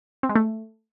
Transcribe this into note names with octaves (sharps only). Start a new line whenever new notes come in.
C4
G#3
A3